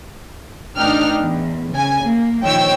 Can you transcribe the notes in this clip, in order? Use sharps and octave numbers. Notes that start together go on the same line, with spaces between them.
A1 D4 D#4 G5 F6
E2
C#3 G#5
A#3
A#1 D#3 F3 C#5 G5 E6